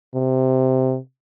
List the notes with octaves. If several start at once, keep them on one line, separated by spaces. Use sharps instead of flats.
C3